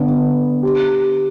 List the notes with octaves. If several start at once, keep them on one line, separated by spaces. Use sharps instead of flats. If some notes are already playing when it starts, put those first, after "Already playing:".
Already playing: D3 B3 D4
G4